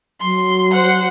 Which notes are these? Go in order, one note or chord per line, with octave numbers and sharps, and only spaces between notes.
F#3 C6
C5 F#5